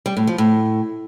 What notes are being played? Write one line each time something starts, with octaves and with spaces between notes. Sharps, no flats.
G3
A2
F3
A2